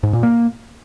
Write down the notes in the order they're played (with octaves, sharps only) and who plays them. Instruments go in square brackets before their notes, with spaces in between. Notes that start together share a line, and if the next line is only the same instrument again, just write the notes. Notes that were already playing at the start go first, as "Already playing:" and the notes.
[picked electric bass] G#2
A#2
A#3